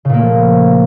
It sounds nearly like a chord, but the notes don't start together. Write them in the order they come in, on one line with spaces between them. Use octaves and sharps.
C#3 A#2 A#3 A3 F3